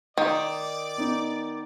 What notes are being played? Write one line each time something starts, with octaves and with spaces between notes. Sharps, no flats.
D#3 D5 D6 D#6 G6
B3 D#4